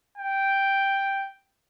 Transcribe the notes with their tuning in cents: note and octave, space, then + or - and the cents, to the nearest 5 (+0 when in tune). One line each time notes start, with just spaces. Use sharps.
G5 +0